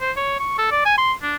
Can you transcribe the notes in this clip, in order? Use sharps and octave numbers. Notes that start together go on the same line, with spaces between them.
C5
C#5
C#6
A4
D5
G#5
C6
D4